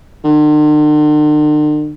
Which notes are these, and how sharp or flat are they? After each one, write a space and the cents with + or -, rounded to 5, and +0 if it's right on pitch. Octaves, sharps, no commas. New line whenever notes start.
D3 +45